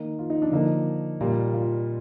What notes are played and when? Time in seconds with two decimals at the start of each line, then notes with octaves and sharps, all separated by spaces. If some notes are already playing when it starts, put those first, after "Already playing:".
Already playing: D#3 A#3 D#4
0.19 F4
0.30 D#4
0.42 D4
0.52 D3 F3 A#3 D#4
1.21 A#2 G3 A#3
1.54 F4